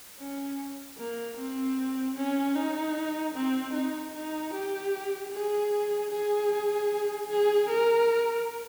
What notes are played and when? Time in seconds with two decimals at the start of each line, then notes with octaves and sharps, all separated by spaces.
0.19 C#4
0.98 A#3
1.37 C4
2.16 C#4
2.55 D#4
3.34 C4
3.73 D#4
4.14 D#4
4.53 G4
5.32 G#4
6.11 G#4
7.29 G#4
7.69 A#4